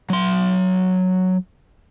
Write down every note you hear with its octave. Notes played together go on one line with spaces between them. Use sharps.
F#3 C6